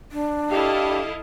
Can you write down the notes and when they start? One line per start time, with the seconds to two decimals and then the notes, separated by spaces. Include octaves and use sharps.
0.12 D4
0.51 E4 G4 A4 D#5 F5